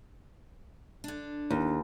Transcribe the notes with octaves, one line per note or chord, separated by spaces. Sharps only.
D3 D4
D#2